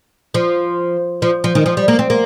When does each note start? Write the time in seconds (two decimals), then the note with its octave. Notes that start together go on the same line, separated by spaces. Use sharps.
0.34 F3
1.22 F3
1.44 F3
1.55 D#3
1.66 F3
1.77 G3
1.88 A#3
1.99 C4
2.10 A#3